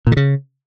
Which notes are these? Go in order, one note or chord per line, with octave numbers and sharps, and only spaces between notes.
A#2
D3
C#3